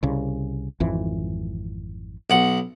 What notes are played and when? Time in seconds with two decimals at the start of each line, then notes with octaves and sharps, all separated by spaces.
0.03 C2 C#3
0.80 G#1 F2 E3
2.30 B1 F#5